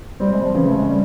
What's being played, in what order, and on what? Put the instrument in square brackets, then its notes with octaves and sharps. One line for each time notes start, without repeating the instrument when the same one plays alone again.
[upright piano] C3 C4 [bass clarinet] G3
[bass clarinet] G#3
F3
[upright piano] C#3 C#4 [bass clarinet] E3
[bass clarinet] A3
G#3
G3